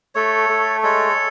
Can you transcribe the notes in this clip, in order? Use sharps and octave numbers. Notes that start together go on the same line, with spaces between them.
A3 A4 C#5
A3
G#3 A4 C#5